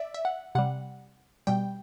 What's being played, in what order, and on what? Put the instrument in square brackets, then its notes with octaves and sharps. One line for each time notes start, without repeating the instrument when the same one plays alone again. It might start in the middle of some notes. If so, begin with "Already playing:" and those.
Already playing: [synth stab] D5 E5
E5
F#5
C3 G3 F#5
B2 G3 G5